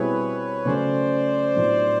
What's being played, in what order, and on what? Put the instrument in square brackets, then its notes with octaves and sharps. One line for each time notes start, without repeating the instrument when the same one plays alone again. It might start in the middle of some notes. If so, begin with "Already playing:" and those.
Already playing: [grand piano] B2 G3 C4 E4 G#4 [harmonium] B4 C#5
[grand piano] C#3 F#3 A3 C#4 [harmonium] C5 D5
[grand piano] A2 F#3 B3 D4 F4